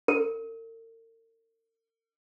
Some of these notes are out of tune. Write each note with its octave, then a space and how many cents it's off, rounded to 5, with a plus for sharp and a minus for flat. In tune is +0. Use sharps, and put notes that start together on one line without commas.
A#4 -45